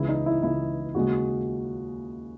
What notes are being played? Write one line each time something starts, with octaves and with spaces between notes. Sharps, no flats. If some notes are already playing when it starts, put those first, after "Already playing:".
Already playing: C#2 C#3 E3 E4
D#4
E4
C#2 C#3 E3 E4
D#2 C#3 G#3 F#4